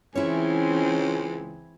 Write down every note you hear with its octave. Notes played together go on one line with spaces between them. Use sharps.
C#2 E3 G#3 C4 C#4 E4 C#5